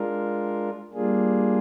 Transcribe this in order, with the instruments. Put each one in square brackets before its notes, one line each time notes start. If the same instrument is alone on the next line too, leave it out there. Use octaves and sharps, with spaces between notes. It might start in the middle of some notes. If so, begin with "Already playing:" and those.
Already playing: [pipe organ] G#3 D4 F4 A#4
G3 A#3 D4 F4 G#4